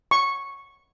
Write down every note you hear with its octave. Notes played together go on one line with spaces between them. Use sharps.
C#6